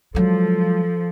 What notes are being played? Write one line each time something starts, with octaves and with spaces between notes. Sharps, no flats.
F3 F#3 G#3 A4